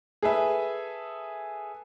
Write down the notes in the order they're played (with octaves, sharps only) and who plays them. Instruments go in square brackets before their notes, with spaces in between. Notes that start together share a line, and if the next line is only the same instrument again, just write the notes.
[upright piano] G#4 A4 B4 E5